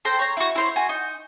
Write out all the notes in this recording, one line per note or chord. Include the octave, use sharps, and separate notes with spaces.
A4 C5 G5 A#5
C#5 A#5
E4 F#4
E4 C5 C#5
F#4 G#5
D#4